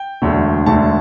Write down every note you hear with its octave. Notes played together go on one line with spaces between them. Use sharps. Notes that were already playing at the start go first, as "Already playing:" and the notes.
Already playing: G5
E1 D2 D3 A3
E1 D2 D3 A3 A5